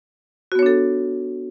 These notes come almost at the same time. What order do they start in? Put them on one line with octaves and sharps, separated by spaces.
F#4 B3 C#5 D4 A4